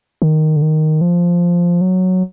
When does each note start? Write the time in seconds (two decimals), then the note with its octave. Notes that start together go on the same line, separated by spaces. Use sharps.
0.22 D#3
0.56 D3
0.62 D#3
1.01 F3
1.81 F#3